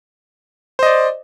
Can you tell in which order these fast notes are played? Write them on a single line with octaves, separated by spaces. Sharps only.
C5 D#5 D5